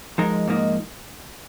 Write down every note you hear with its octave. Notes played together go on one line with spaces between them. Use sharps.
F3 G#3 D#4 A#4
G#2 F3 A#3 D#4